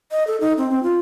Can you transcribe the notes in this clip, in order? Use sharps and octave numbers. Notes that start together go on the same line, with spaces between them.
D#5
A4
D#4
C4
C4
F4